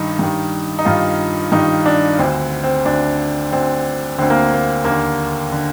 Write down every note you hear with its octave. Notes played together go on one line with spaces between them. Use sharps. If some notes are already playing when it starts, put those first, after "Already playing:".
Already playing: G2 D#3 D#4
G2 D#3
D#4
G2 D#3 F4
G2 D#3 D#4
D4
D2 D3 C4
C4
D2 D3 D4
D2 D3 C4
D2 D3 C4
A#3
A#3
D#2 D3 A#3
D3